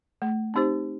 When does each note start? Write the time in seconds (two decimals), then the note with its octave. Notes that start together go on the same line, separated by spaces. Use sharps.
0.22 A3
0.54 C4 D#4 G4 C5